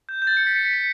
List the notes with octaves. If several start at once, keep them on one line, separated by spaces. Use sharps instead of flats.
G6
G6
A6
C#7
B6
C#7
B6
C#7